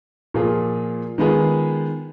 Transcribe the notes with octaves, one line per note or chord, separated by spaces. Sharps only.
A#2 F3 A#3 F4 G#4
D#3 G#3 B3 F4 G#4